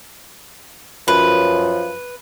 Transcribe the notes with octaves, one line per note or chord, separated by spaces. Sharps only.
F#2 F3 B4